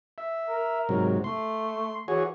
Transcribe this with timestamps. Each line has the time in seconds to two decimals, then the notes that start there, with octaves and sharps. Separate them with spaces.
0.18 E5
0.48 A#4
0.89 G#2 C3 F#3
1.24 A3 C6
2.08 E3 F#4 G#4 C#5